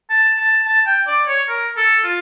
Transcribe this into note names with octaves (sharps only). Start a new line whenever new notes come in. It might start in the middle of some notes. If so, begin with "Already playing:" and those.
A5
A5
A5
G5
D5
C#5
A#4
A4
F4